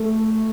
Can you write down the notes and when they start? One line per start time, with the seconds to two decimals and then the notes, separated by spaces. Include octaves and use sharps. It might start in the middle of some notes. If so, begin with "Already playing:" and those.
Already playing: A3